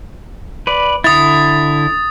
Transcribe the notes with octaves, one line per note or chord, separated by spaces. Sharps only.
B4 D5
D3 E4 D#6 A6